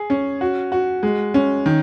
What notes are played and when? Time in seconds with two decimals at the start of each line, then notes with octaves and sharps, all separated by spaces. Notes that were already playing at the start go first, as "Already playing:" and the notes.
Already playing: G#4
0.10 C#4
0.41 F#4
0.72 F#4
1.03 G#3
1.34 C#4
1.66 D#3